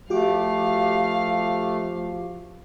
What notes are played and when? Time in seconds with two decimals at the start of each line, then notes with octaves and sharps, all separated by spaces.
0.10 F3 A3 F#4 G4 F5 D6